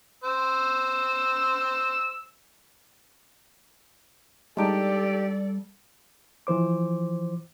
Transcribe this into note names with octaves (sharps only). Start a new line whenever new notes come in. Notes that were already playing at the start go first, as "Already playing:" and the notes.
C5 E6
G3 G#3 D4 D#4 G4 A4 D5
E3 F3 C5 D6